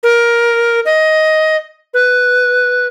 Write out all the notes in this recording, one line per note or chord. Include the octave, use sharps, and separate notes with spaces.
A#4
D#5
B4